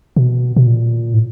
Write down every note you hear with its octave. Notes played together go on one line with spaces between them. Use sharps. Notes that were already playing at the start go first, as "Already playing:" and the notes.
B2
B2
A#2
A2